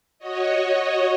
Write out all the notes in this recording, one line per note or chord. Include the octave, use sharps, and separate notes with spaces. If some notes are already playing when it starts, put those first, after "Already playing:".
F#4 C#5 D#5